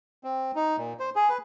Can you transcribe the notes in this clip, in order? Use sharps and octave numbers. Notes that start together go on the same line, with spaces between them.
C4
D#4
A#2
C5
G#4
B4